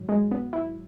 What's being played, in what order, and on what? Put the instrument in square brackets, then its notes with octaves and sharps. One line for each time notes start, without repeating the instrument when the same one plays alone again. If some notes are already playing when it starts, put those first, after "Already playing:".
Already playing: [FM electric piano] G#2 D#3 F#3
[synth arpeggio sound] G#3
B3
E4